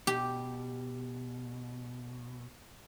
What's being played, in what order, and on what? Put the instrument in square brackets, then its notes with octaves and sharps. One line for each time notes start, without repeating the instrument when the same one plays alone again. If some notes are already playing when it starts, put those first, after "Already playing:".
[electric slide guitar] B2 [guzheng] G4